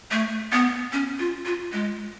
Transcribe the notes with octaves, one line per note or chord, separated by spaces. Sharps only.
A3
B3
C#4
F4
F4
G#3